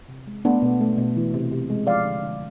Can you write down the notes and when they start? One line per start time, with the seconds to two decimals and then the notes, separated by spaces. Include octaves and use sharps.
0.09 C3
0.27 G#3
0.45 A3 B3 D4
0.62 B2
0.81 A3
0.98 B2
1.16 E3
1.34 C3
1.51 C3
1.70 G#3
1.87 F3 D5 F5
2.05 D3
2.22 D3